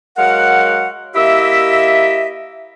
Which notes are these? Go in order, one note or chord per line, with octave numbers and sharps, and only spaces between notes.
F#3 G#3 A#4 F5 F#5
A#3 E4 G4 D#5 E5